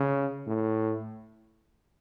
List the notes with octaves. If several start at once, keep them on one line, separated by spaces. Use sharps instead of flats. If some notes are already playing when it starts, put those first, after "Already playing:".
Already playing: C#3
A2